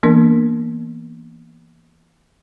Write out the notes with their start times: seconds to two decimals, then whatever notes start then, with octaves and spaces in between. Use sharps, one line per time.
0.03 E3 A#3 B3 D4 A#4